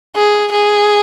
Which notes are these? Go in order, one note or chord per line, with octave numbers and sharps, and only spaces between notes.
G#4
G#4